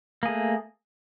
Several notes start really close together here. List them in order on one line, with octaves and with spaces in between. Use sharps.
A#3 G#4 A3